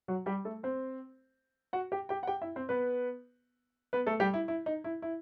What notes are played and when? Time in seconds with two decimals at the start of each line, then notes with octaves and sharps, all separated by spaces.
0.08 F#3 F#4
0.26 G3 G4
0.45 A3 A4
0.63 C4 C5
1.73 F#4 F#5
1.92 G4 G5
2.09 G4 G5
2.23 F#5
2.27 G4 G5
2.42 E4 E5
2.56 C4 C5
2.69 B3 B4
3.93 B3 B4
4.07 A3 A4
4.20 G3 G4
4.34 E4
4.48 E4
4.66 D#4
4.84 E4
5.02 E4